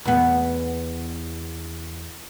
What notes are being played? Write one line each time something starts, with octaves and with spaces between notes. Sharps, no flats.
E2 B3